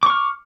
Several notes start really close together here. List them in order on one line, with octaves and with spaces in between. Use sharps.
D6 C#6 F6